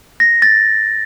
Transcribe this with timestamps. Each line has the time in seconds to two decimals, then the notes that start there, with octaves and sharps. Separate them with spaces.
0.20 A#6
0.42 A6